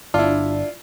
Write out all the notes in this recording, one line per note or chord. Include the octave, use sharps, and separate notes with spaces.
G1 D4 E4 F4